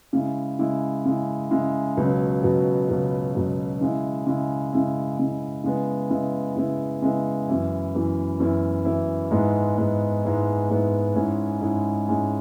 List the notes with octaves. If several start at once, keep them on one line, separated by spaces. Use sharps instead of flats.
C#3 G#3 E4
C#3 G#3 E4
C#3 G#3 E4
C#3 G#3 E4
C#2 B2 F#3 B3
C#2 B2 F#3 B3
C#2 B2 F#3 B3
C#2 B2 F#3 B3
C#3 G#3 E4
C#3 G#3 E4
C#3 G#3 E4
C#3 G#3 E4
C#3 G#3 B3 E4
C#3 G#3 B3 E4
C#3 G#3 B3 E4
C#3 G#3 B3 E4
F#2 E3 B3 E4
F#2 E3 B3 E4
F#2 E3 B3 E4
F#2 E3 B3 E4
G#2 G#3 B3 E4
G#2 G#3 B3 E4
G#2 G#3 B3 E4
G#2 G#3 B3 E4
G#2 G#3 C#4 E4
G#2 G#3 C#4 E4
G#2 G#3 C#4 E4